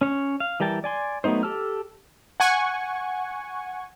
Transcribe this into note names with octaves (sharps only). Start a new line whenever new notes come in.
C#4 C#5
F5
E3 G3 A#4 G5 A5
D5 G#5 C6
F#3 A3 B3 D#4 C5
G4 A4 A5 E6 F6
F#5 G#5 C#6